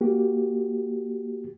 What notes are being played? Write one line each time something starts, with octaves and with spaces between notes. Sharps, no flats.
A#3 F#4 G4